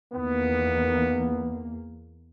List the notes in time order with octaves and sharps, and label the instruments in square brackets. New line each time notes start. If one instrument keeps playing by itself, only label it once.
[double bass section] E2 A#3 [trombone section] D#3 B3